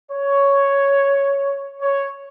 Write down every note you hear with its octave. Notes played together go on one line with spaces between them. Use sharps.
C#5
C#5